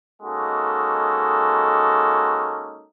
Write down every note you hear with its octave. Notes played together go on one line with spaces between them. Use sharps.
G#3 A#3 C#4 D#4 F#4 A4